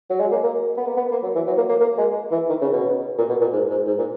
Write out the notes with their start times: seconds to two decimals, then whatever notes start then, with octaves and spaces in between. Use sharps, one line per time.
0.10 F#3
0.20 G#3
0.31 A#3
0.43 A#3
0.77 B3
0.87 A#3
0.97 B3
1.12 A#3
1.23 F#3
1.35 E3
1.47 F#3
1.57 A#3
1.69 A#3
1.80 A#3
1.98 G#3
2.32 E3
2.49 D#3
2.61 C#3
2.73 B2
3.18 A#2
3.29 B2
3.41 A#2
3.53 G#2
3.70 G#2
3.87 G#2
3.98 A#2